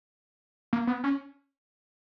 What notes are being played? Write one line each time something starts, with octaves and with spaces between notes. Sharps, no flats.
A#3
B3
C#4